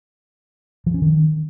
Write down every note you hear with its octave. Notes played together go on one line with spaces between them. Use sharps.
F3
C#4
D#3